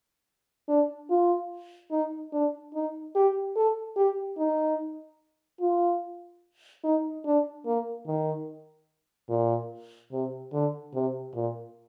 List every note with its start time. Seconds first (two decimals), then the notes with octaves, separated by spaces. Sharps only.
0.68 D4
1.10 F4
1.91 D#4
2.32 D4
2.74 D#4
3.15 G4
3.56 A4
3.96 G4
4.38 D#4
5.61 F4
6.84 D#4
7.25 D4
7.66 A#3
8.06 D#3
9.29 A#2
10.12 C3
10.53 D3
10.94 C3
11.34 A#2